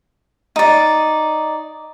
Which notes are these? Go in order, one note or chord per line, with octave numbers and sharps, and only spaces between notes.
D#4 D5